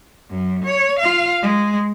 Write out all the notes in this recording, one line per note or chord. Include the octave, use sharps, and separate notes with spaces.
F#2
C#5
F4 F5
G#3